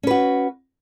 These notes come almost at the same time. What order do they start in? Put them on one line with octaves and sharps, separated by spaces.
C#4 B4 F#4